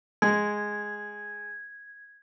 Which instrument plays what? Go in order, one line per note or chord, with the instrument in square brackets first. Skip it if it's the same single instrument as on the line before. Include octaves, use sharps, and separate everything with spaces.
[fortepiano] G#3 [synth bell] G#6